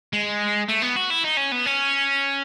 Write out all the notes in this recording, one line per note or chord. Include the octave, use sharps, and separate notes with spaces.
G#3
A3
B3
F#4
E4
D#4
C#4
B3
C#4